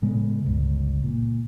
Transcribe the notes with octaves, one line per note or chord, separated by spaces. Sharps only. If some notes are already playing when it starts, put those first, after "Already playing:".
A2 C#3 G#3 B3
G1 C#2
A#2